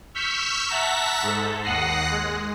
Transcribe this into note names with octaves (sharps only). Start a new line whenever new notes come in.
C#6 E6 F6 G6 B6
E5 F#5 A5 A#5 B6
G#2 A4
D#2 F#5 D#6 F#6 A#6 C7
G#3